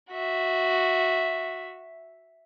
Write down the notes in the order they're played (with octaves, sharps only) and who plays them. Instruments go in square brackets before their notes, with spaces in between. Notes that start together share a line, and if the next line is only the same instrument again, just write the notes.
[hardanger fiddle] F#4 E5